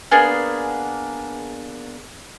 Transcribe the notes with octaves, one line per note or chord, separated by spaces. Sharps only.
A#3 B3 D4 G#4